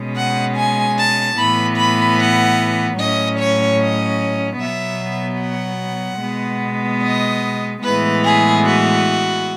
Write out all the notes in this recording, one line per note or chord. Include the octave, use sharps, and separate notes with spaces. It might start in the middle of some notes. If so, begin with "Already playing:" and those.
Already playing: B2 G#3 C#4
F#5
G#5
A5
A2 E3 B3 B5
B5
F#5
A2 F#3 C#4 D#5
C#5
D#5
B2 F#3 B3 E5
F#5
B2 G#3 B3
D#5
A2 E3 G#3 B3 B4
G#4
F#4